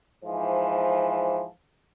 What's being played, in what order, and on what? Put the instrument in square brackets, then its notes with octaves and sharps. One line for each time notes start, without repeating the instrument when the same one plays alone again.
[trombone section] G#2 E3 F3